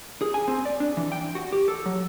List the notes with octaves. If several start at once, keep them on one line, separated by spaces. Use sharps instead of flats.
G#4
G#5
C4
D5
D4
E3
G5
F#4
G4
A4
F#3